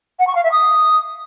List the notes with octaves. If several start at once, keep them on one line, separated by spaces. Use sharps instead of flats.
F#5
C#6
F5
E5
D#6